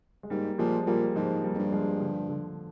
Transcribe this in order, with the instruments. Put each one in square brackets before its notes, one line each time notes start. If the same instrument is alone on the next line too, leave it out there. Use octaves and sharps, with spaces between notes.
[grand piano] G#3
[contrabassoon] G#2 [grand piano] G3 A#3
[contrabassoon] A#2 [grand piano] F3 G#3
[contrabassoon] A#2 [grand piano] G3 A#3
[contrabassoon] G#2 [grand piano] F3 G#3
[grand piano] G3 A#3
[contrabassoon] F2
G2
[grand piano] G3
F3 G#3
D3 F3
D3 F3